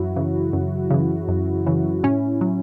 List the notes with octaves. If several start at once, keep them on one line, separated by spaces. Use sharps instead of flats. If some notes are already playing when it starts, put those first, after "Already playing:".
Already playing: F#2 E3 F#3 E4 F#4
C#3 E3
F#2
C#3 E3
F#2
C#3 E3
A2 C#4
F#3